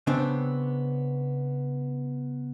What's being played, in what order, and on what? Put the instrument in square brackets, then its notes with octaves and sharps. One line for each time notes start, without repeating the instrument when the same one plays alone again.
[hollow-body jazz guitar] C#3 B3 C4 D4